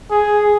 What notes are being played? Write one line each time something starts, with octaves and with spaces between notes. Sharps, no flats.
G#4